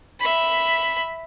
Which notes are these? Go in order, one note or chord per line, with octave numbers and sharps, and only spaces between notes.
E5 B5